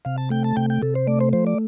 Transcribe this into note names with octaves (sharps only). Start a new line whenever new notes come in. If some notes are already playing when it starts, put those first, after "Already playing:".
C3 F5
A5
A3 G5
A5
C3 G5
G5
C3 A4
C5
A3 D5
C5
F3 C5
D5